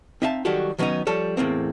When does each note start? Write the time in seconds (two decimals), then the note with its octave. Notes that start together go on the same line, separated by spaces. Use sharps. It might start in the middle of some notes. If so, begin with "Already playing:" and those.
0.22 C4 D#4 E5 F5 A5
0.45 D#3 F#3 G3 F#4 G4 A4
0.79 D#3 F#3 G3 B3 C#4 D#4
1.07 F3 G3 A4 C#5
1.37 E2 A2 A#3 C4